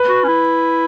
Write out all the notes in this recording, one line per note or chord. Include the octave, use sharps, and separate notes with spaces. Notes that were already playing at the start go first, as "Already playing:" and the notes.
Already playing: B4
F#4
C#4
E4